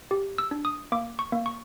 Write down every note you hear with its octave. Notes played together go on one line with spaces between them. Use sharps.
G4
E6
D4
D#6
A#3 D6
C#6
A#3
C#6